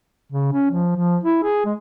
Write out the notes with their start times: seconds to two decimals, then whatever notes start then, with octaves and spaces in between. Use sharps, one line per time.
0.32 C#3
0.53 C#4
0.71 F3
0.97 F3
1.24 E4
1.44 G#4
1.65 G#3